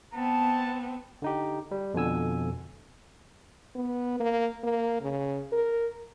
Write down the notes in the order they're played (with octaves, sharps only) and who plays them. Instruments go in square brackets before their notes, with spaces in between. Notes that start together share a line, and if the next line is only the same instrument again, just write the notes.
[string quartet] B3 C4 [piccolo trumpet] A5
[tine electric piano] D3 D#4 G4
G3
F2 B2 D3 G#5 E6
[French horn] B3
A#3
A#3
C#3
A#4